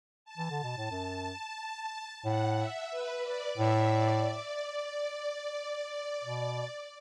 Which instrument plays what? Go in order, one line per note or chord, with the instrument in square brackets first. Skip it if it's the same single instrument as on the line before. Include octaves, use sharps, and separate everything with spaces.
[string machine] A5
[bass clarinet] E3
D3
B2
A2
F#2
[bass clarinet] A2 [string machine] F#5
[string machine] E5
B4
D5
[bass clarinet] A2 [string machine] E5
[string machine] D5
D5
[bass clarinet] B2